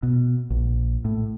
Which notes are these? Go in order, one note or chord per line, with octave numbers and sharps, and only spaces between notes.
B2
A#1
A2